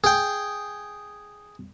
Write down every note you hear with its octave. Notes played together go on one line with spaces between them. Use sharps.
G#4 G5